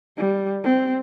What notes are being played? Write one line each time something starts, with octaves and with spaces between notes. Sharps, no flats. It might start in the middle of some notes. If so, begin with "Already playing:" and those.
G3
C4